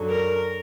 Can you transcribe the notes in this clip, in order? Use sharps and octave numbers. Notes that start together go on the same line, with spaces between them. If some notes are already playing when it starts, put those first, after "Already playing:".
Already playing: F#2 D3 F#3
A#4